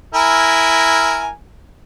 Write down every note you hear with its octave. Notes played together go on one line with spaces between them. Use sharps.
E4 A#4 G#5